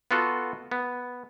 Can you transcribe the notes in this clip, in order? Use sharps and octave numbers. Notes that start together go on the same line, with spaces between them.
B3 F4 F#4 A4
B3